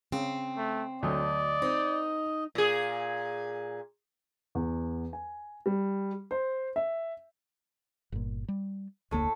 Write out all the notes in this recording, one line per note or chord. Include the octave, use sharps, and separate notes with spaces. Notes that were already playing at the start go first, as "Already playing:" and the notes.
C#3 C4
A3
D2 F#3 A3 D5 D#5
C4 D#4
A#2 G#4
E2
G#5
G3
C5
E5
G1 A#2
G3
F1 D2 A2 A#3 A4